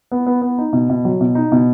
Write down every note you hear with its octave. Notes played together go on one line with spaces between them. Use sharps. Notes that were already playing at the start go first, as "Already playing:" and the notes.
B3
B3
B3
D#4
B2
B2
F#3
B2
D#4
B2